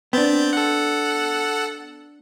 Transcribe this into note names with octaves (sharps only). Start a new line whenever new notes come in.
B3 C4 D4 G6 A6
A4 F#5